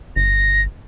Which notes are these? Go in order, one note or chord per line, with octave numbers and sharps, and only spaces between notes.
G1 A#6